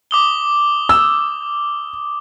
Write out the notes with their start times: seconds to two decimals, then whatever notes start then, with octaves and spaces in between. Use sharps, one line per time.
0.11 D6 D#6 G7
0.89 E6